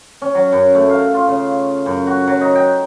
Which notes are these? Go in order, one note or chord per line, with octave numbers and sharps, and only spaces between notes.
C#4
F#3
F#2
A3
F5
F4
C#3
F#2
F#4
F#3
D#4
G5